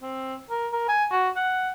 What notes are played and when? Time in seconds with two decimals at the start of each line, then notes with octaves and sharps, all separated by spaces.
0.02 C4
0.50 A#4
0.73 A#4
0.89 G#5
1.11 F#4
1.36 F#5